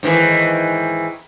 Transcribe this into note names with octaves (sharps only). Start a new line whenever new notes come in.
G#2 D#3 E3